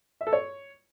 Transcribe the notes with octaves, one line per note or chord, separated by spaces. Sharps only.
E5
A4
C#5